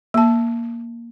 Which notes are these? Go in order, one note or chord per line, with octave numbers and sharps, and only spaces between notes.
A#3 A5